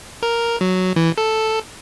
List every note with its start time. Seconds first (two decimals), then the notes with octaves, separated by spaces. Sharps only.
0.23 A#4
0.61 F#3
0.96 E3
1.18 A4